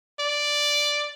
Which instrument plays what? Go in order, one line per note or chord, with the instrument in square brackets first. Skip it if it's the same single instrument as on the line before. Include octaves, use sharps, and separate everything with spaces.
[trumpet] D5